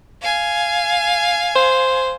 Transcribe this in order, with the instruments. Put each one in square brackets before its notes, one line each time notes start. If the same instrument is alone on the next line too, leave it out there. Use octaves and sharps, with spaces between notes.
[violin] F5 G#5
[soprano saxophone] C5